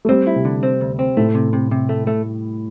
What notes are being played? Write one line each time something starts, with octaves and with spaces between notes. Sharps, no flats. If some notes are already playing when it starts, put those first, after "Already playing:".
A3
G3 C4
E4
C3
D3
C4
D2
C4
A2 A3
C3
C3
C3
A3
A3